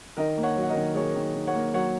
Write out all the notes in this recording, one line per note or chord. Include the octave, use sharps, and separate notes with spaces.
D#3 A#4 D#5
A#3
C#5 F#5
F#3
F#5
A#4 D#5
D#3
A#3 G#4 C#5
D#3
D#3
C#5 F#5
A#3
F#3 C#5 F#5